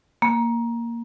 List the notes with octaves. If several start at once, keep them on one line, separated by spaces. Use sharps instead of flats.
A#3